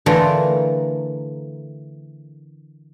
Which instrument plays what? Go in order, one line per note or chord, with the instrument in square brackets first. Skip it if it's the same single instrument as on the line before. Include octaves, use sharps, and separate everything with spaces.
[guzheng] D3 E3 A3 F4 A4 A#4